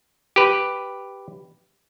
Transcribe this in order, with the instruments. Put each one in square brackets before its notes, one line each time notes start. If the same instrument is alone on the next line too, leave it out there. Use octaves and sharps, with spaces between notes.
[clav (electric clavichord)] G4 B4